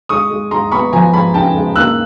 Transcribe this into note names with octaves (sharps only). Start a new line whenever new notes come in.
G#3 C#6 D#6
G#3
G#3 A#5 C6
B3 B5 C#6
F3 G#5 A#5
G#3 A5 B5
C#3 G5 A5
G#3
A#3 E6 F#6